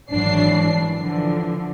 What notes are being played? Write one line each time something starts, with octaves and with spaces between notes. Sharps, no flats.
G#1 E3 F#3 D4 C7
D3 E3 F3